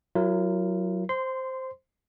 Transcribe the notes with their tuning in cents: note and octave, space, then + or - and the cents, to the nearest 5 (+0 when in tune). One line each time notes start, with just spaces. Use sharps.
F#3 +0 E4 +45 A#4 +0
C5 +0 C6 -20